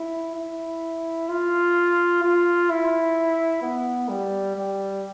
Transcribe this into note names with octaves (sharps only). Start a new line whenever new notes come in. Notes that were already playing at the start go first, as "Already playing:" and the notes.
Already playing: E4
E4
F4
F4
E4
B3
G3
G3